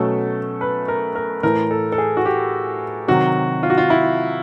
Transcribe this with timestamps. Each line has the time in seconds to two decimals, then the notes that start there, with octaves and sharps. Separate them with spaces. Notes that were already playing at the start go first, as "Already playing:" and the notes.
Already playing: B2 F#3 A3 C#4 A4
0.61 B4
0.88 A#4
1.15 A#4
1.43 A2 E3 A3 A#4
1.71 A4
1.92 A4
1.98 G#4
2.17 F#4
2.25 G4
3.08 C3 D#3 F#3 F#4
3.63 F4
3.70 F#4
3.78 F4
3.90 E4